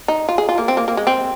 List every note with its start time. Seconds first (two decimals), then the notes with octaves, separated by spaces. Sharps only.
0.08 D#4
0.29 F4
0.38 G#4
0.49 F4
0.58 A#3
0.68 C4
0.77 A#3
0.88 A#3
0.97 G#3
1.07 C4